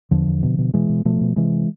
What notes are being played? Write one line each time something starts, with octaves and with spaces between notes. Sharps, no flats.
E2 D3 F3
E2
B2
B2
B2 E3 G#3
B2
B2 F3 A3
B2
C3 E3 G#3